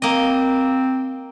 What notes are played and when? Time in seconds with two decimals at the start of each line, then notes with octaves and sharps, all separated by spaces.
0.02 A#3 C4 D#5